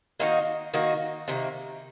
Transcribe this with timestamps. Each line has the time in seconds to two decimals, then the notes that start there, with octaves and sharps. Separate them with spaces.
0.20 D#3 A#3 D#4 F#4
0.74 D#3 A#3 D#4 F#4
1.28 C3 D#3 A#3